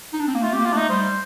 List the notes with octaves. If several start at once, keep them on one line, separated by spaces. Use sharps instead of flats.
D#4
D4
C4
A#3
A3 F4
C4 G4
A#3
F4
A3 D4 D#4
G3 C5